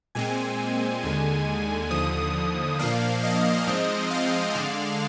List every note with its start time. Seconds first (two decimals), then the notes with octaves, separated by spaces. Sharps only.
0.15 A#2 G#3 C4 G#5
1.03 D#2 D3 G#3 G#5
1.91 D#2 D3 F3 D#6
2.79 A#2 F3 A#3 D4 F5
3.23 D#5
3.67 G#2 F3 G#3 C4
4.11 F5
4.55 D3 G#3 D4